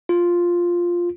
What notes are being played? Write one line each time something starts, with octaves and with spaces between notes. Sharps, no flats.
F4